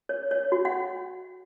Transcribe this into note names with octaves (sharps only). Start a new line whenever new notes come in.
C#5
C#5
F#4
F#5